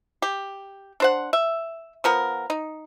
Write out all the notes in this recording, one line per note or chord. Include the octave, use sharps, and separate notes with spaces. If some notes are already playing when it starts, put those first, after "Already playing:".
G4
D4 C5 F#5
E5
F3 B3 A#4
D#4